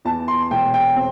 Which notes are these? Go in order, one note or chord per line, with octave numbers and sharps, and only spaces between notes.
E2 A5
C6
E1 G5
G5
C4